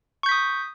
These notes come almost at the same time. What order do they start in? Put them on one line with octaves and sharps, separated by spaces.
C#6 G6 B6 D#6